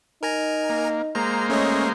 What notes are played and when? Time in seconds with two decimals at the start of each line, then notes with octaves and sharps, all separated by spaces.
0.23 D#4 A#4 G#5 A#5
0.70 A#3
1.15 G#3 A#3 C5 A#5
1.50 A3 C#4 C#5 D#5